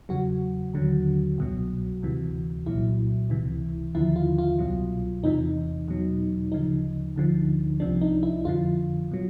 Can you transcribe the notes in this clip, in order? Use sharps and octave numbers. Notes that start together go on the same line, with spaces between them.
E2 C#3 F#3 F#4
D#2 D3 F#3
C2 B2 F#3
D2 C3 E3
C2 A#2 F#3 E4
C#2 C3 E3
D#2 D3 F3 E4
F4
F4
C2 B2 F#3
E2 C3 E3 D#4
E2 B2 F#3
D2 C#3 F3 D#4
D2 D3 F3
C2 C3 F3 D4
D#4
E4
F2 D3 F3 F4
B2 F#3